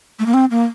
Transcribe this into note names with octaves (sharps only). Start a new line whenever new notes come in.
A3
A#3
C4
A#3